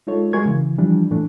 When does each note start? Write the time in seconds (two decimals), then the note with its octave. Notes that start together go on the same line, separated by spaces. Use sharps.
0.07 G#3 D#4 F4 A4 C#5
0.33 G#3 F#4 G#4 A#4 C#6 G#6
0.46 C#3 E3
0.78 E3 F3 G3 D4
1.11 A2 E3 A3 D4